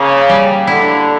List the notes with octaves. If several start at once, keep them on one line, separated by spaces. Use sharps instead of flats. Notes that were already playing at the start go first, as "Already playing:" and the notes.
Already playing: C#3 A#3
G3
D3 E4